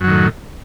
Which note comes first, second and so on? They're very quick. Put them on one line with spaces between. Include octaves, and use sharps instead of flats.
F#2 F#3 D#3 A2